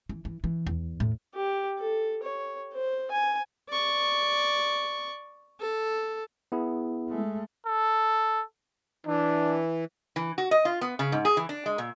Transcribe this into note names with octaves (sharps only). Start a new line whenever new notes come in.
E3
E3
E3
E2
A2
G4
A4
C#5
C5
G#5
D5 C#6
A4
B3 E4 G#4
G#3 A3
A4
E3 D4
E3
F#4
D#5
F4
B3
C#3
G#2
G#4
E3
D4
G#3
A#2